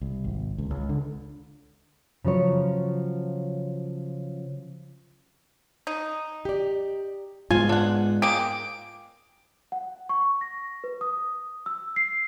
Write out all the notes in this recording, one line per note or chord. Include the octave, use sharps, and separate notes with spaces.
C2
G#1
C#2
C#2
D3
C#3 F3 F#3 C#5
D#4
G4 D5
G#2 G#3 B3 F4 G#5
D4 F#5
G#3 A#3 G5 D6 D7
F#5
C#6
A#6
B4
D#6
E6
C7